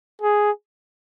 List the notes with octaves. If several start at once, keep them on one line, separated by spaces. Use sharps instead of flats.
G#4